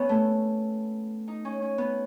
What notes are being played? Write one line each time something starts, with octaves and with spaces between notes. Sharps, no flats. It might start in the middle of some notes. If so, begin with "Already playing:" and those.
Already playing: B3 C#4
A3
D#4
C#4
C#4
B3